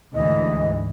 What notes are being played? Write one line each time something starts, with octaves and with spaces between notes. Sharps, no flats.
D2 G#2 E3 D#5